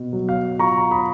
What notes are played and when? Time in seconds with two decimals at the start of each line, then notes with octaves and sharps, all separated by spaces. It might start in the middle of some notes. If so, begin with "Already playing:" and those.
Already playing: B2
0.13 F#3
0.29 F5
0.59 F4 A#5 C#6
0.91 B5 D#6